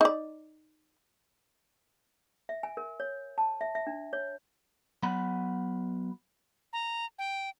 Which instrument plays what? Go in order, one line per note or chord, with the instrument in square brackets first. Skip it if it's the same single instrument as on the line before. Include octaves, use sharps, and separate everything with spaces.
[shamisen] D#4 D5
[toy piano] E5
G#5
A#4
C#5
A5
E5
E5
D4
C#5
[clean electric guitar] F#3 B3 F#5 B5
[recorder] A#5
G5